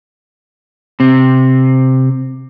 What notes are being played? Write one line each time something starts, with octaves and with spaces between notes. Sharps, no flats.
C3 C4